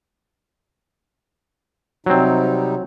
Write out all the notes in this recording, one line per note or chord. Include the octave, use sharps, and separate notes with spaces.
C3 F#3 G3 C4 D#4